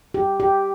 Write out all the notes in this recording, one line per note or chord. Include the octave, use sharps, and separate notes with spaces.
G4
G4